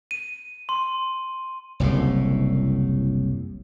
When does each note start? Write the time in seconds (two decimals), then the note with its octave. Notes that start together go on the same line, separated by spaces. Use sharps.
0.11 D#7
0.69 C6
1.80 F#1 C2 A2